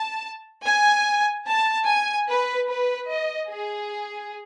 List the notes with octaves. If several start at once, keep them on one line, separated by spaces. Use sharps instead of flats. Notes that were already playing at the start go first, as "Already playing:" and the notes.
Already playing: A5
G#5
A5
G#5
B4
B4
D#5
G#4